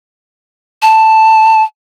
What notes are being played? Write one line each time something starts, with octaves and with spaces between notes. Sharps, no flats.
A5